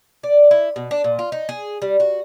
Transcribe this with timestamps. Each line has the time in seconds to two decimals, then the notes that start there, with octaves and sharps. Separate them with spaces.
0.23 D5
0.51 E4
0.76 B2
0.91 D4
1.04 A#2
1.19 F4
1.32 D#4
1.49 G#4
1.82 G3
2.00 F#4